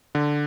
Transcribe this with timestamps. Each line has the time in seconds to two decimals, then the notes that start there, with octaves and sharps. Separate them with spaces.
0.15 D3